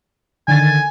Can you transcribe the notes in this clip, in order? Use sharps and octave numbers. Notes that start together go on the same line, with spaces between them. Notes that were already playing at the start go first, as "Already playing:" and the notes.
D3 D#3 G#5 A6